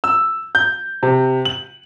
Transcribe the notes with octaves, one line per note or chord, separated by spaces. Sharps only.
E6
G6
C3
F#7